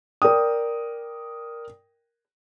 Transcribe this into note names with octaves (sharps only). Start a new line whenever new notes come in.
A#4 D5 G5 D#6